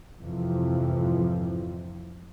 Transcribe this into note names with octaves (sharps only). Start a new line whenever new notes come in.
G#1 F2 C3 E3 F3